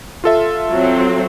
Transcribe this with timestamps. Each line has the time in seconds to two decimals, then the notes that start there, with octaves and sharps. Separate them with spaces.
0.24 F4 A4 E5
0.70 F#3 C4